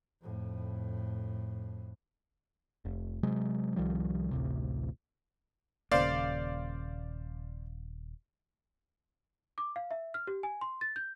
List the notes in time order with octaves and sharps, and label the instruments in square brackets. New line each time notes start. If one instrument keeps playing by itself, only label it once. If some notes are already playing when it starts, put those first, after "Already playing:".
[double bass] F2 A2
[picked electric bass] F1
C3 F#3 G#3
C2 D#3 F3 G3
A1 D2 C3
[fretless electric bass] D#1 C#3 A#3 [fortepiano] C5 D5 F5
[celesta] D6
F5
E5
F6
G4
G#5
C6
A6
G6